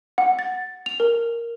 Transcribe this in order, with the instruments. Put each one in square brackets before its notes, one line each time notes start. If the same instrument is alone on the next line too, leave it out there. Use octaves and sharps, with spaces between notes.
[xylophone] F#5
A6
F7
A#4